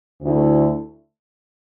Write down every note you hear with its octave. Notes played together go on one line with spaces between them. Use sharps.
D2 D3 A3 E4